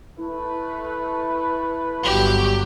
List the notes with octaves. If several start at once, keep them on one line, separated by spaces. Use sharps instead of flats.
A3 E4 B4
G1 F#3 G4